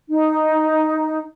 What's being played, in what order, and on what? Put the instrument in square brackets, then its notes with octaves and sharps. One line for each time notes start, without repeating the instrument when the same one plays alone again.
[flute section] D#4